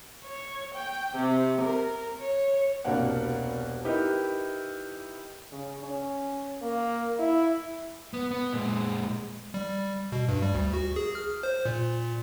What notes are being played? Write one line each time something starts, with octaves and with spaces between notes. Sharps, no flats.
C#5
G5
C3
A#4
C#5
E1 C2 B2 A#3 D4 F#5
D#4 E4 G4 A#4 B4
C#3
C#4
A#3
E4
B3
B3
A#2 G#3
G3
B2
G2
G3
D2
F#4
G#4
F6
C5
A#2